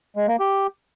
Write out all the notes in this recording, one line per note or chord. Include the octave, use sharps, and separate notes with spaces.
G#3
A#3
G4